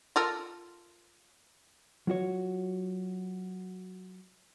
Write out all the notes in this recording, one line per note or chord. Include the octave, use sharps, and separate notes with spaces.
F4 A4 A#4
F#3 F4 F#4 C#5